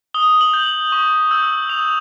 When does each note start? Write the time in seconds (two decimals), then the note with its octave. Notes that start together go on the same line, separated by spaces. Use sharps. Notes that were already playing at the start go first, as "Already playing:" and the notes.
0.14 D#6 G7
0.41 F#7
0.54 G6
0.66 F#7
0.92 C#6
1.31 E6 G6
1.69 D#6 F7